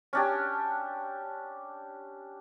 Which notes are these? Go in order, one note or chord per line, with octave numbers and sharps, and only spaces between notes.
C#4 D4 G4